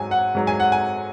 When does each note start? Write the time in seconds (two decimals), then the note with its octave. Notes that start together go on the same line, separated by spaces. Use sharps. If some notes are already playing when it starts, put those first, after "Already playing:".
Already playing: G#2 F#3 G#5
0.11 F#5
0.35 G#2 F#3
0.47 G#5
0.60 F#5
0.72 G#5